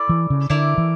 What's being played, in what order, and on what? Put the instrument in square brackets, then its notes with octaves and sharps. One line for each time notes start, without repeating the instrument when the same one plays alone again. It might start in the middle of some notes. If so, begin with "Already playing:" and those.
Already playing: [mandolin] E4 A4 D5
[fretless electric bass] E3
C#3
[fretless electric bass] D3 [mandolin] A3 E4 A#4 D5
[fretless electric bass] E3